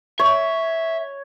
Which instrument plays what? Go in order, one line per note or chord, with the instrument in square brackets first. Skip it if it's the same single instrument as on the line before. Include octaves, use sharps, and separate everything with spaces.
[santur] C#5 [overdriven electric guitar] E5